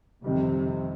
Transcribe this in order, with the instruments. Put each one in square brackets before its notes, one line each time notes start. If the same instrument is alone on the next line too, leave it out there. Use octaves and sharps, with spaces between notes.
[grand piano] F2 D#3 G3 [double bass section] C3